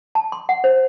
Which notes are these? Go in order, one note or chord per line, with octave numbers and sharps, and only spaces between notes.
A5
C6
F#5
C5